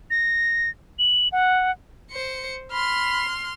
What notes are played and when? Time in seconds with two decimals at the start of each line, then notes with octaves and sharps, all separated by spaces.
0.11 A#6
0.99 F#7
1.32 F#5
2.11 C5 C#7
2.72 B5 C6 F6